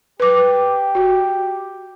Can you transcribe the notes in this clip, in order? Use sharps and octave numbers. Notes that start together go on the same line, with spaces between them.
G4 B4 D6
F#4